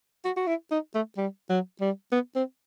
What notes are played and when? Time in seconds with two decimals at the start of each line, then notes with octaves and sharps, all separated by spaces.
0.24 F#4
0.36 F#4
0.47 E4
0.71 D#4
0.94 A3
1.17 G3
1.49 F#3
1.81 G3
2.12 B3
2.35 C4